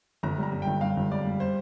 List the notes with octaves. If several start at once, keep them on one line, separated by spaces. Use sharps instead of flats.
G1 A#5
G3 A#5
G2
G1 G5
G2 F5
G1
G3 D5
G3
C5